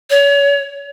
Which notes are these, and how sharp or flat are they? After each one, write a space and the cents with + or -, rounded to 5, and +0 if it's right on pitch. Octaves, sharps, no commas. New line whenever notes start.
C#5 +35